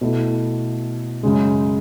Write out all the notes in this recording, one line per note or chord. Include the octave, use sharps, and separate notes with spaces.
B2 A3 E4
F#2 C#3 G#3